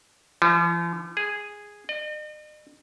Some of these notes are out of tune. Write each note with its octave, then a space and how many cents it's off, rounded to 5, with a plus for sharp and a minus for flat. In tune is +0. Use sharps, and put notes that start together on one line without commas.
F3 -45
G#4 -5
D#5 -45